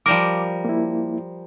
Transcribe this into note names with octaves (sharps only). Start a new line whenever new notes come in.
F3 G3 A#4 D6
A#3 E4